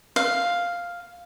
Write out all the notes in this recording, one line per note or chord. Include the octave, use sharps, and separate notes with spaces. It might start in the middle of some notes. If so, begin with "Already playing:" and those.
F5